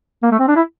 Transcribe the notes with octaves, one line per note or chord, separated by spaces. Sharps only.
A#3
A3
C4
D4
E4